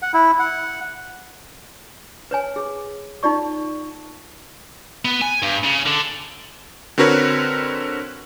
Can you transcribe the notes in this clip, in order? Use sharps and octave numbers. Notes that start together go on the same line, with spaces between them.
F#5
E4
F#5
B4 C#5 G#5
G#4
D#4 F4 D5 C#6
B3
G#5
G2
C#3
D3
D3 C4 F#4 A#4 B4 C#5